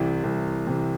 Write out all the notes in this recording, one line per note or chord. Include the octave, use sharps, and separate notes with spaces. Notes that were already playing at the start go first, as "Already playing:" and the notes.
Already playing: C2 C3 E3
C2
C3 E3